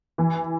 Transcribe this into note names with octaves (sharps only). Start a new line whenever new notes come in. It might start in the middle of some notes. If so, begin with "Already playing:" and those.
E3